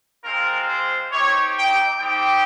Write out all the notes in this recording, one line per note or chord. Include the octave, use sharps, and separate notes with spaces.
G#3 C4 F4 A#4
C5
C4 D#4 G4 C#5
G5
G3 C4 D#4 G4 G5